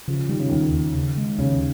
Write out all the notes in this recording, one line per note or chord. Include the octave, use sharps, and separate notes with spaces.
C#3 F3
D#3 G3
C#3
D#2 D#3
D#2
C#3
G#3
D#2 C#3